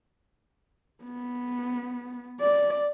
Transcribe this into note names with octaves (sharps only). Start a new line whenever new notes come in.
B3
D5